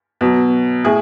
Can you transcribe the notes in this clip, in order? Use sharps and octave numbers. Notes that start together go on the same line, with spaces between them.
B2 F#3
A2 G#4